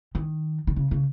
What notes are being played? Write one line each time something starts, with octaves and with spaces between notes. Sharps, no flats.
D#3
D#3
C#3
C#3